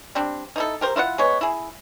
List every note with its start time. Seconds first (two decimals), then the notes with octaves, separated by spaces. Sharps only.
0.15 G3 C4 D4
0.56 D#4 E4 A4
0.81 G4 A#4 C5
0.96 E4 F4 D#5 F#5
1.18 G#3 B3 C#5
1.41 E4 G#4